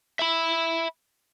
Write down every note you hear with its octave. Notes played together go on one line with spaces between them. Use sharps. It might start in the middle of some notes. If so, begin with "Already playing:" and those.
E5 B5